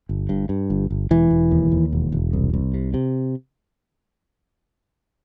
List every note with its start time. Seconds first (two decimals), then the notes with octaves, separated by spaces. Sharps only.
0.09 G1
0.29 G2
0.49 G2
0.70 G1
0.91 G1
1.11 E1 E3
1.31 E1
1.51 D#2
1.72 D#2
1.93 E1
2.12 E1
2.33 C2
2.54 C2
2.74 C3
2.94 C3